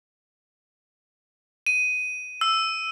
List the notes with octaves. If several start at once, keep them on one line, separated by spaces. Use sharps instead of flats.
D#7
E6